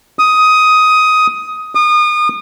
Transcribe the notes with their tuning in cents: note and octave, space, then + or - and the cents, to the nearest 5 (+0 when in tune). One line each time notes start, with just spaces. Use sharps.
D#6 +10
D#6 -35